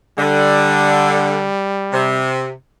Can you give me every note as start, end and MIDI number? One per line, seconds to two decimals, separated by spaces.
0.18 1.48 50
0.18 2.28 55
1.92 2.53 48